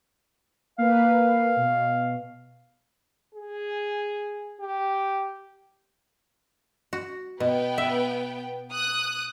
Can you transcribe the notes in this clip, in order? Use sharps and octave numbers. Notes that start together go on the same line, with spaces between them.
A#3 B4 F5
B2
G#4
G4
F#4
B2 B3 G5
E5
D#6 F#6